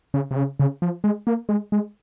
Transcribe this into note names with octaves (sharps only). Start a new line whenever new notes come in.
C#3
C3
C#3
C#3
F3
G#3
A#3
G#3
G#3